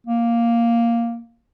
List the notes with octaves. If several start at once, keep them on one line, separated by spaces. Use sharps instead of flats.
A#3